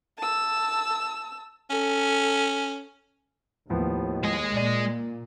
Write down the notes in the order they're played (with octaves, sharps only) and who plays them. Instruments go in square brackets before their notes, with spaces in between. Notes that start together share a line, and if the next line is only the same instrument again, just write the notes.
[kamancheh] A5 E6
[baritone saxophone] C#4 [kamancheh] A4
[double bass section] D#2 [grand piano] A2 F3 B3
[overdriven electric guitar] G#3 D#5
[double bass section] A#2 [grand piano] D5 D#7